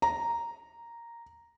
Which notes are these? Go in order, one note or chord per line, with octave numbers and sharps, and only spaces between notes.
A#5